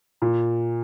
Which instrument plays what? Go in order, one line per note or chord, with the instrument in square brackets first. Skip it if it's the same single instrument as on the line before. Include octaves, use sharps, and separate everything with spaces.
[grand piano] A#2